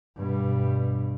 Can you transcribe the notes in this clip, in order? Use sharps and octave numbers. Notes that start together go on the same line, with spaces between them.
G2 B2